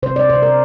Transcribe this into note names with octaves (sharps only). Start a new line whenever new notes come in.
C3 C5
D5
C3 C5
A#4